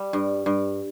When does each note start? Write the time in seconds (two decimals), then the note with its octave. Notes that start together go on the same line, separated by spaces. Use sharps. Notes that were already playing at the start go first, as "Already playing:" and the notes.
Already playing: G3
0.13 G2
0.46 G2